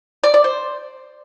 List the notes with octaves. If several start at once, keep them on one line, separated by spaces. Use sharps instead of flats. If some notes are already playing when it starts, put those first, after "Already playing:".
D5
D5
C5